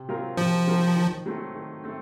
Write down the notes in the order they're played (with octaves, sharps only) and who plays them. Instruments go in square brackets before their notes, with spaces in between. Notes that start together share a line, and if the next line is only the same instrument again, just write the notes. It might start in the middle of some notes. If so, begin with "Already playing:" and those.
Already playing: [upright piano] C3
F#3 C4 F4 A#4
[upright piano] C3 [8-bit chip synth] F3
[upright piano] F#3 C4 F4 A#4
D#3
F#3 A3 C4
D#3
A3 C4